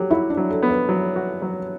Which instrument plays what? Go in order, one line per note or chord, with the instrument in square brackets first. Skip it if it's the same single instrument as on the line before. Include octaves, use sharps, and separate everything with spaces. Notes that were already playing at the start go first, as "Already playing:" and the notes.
Already playing: [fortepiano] F#3 [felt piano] G4
[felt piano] E4 [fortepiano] F#4
[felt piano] D4
[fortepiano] F#3
[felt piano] A4
[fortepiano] B3
[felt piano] B4
[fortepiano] F#3
F#4
F#3